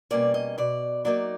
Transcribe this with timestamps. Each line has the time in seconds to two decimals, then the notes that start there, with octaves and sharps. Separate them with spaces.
0.10 B2 G3 A#3 C#4 D5
0.34 D#5
0.58 B2 D5
1.05 F#3 A#3 D#4 D5